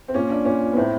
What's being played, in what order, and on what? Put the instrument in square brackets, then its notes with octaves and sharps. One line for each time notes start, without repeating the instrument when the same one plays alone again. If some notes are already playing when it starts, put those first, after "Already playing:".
[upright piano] C4
A#2 C#4
D4
A#2 C#4
B3
A2 C4